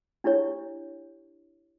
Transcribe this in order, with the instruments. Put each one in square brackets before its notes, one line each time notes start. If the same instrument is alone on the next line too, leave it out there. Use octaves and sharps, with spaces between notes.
[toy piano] D4 E4 G4 C#5